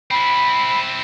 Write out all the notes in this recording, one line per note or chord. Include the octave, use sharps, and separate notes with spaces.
C4 E4 B5